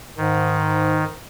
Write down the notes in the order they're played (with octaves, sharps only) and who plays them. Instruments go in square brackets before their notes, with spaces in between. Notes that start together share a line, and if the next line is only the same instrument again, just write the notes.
[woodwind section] G#2 [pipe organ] D#3